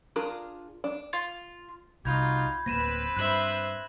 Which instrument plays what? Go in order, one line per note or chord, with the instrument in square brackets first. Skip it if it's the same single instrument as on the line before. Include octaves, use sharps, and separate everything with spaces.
[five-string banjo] D4 F4 G#4 A#4
D4
[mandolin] F4
[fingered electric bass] C2 [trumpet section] D#4 F4 F#4 [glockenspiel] B5 G6 G#6
[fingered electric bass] D1 A#3 [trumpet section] C4 B4 [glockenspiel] A#6 D#7 E7
[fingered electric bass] G2 [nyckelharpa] C5 E5 [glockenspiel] F#6 F#7